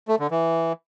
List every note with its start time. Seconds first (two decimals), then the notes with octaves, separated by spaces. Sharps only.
0.08 A3
0.20 D3
0.31 E3